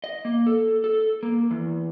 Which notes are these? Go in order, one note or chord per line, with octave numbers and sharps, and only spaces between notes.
D#5
A#3
A4
A4
A#3
E2